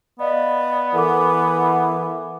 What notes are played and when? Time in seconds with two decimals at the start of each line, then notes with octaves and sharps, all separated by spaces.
0.19 B3 D5 D#5 F5
0.94 E3 A4 A#4 F#5 D6